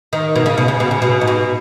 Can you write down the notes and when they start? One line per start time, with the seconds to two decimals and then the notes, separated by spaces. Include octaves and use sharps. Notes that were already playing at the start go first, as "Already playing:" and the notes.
0.13 D#3
0.35 B2
0.46 C#3
0.58 B2
0.68 C#3
0.80 B2
0.91 C#3
1.02 B2
1.21 G#2
1.27 B2